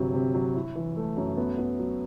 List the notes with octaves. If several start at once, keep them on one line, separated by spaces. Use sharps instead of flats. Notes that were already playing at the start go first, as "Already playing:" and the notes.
Already playing: G1 C3 F#3
C3
F#3
E4
E3
A3
F#2
B3
B3
F#3